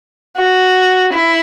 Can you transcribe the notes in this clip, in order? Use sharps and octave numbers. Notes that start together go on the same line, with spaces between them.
F#4
E4